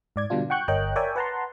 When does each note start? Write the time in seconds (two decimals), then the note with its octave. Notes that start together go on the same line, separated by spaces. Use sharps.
0.16 G#2 D5 G#6
0.30 B2 D3 G3 D4 F4
0.50 F#5 G5 C#6 F#6 G6
0.68 G1 A#4 C#5 D#5 G5 F#6
0.96 A#4 C#5 D5 E5 G5 G#5
1.16 B4 F#5 A5 A#5 C6